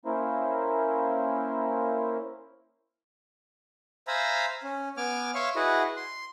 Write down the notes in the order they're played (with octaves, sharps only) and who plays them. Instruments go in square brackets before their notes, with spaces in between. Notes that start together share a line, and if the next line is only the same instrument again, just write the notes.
[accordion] A#3 C#4 E4 A#4 C5
[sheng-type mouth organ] C5 E5 F5 G#5 A#5 B5
C#4
B3 G#5 D6 F6
C#5 E5 F5 C6 C#6
E4 F#4 G#4 B4 D#5 F#5
C6